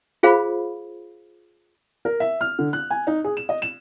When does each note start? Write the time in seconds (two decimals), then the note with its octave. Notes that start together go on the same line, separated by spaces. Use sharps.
0.23 F4 G#4 C5 F5 B5
2.05 A#4
2.20 E5
2.41 F6
2.59 D3
2.73 F#6
2.90 G#5
3.07 D#4
3.24 G#4
3.37 E7
3.49 D#5
3.62 E7